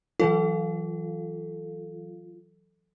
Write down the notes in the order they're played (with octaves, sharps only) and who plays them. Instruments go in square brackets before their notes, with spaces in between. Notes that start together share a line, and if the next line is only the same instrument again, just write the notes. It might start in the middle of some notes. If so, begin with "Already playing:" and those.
[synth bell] E3 F#3 A4 [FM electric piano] F4